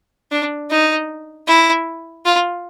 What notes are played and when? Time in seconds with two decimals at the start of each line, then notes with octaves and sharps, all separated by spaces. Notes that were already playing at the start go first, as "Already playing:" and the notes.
0.31 D4
0.70 D#4
1.47 E4
2.25 F4